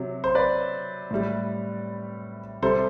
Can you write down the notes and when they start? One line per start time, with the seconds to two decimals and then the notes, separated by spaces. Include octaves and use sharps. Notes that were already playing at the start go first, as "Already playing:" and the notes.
Already playing: C3 F#3
0.24 C5
0.35 B4 D5
1.11 A2 G3
2.62 C3 G3 A4 C5